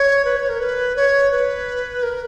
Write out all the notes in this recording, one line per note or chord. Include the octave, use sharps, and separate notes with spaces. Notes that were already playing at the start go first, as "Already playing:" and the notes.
Already playing: C#5
B4
C#5
A#4
B4
C#5
B4
A#4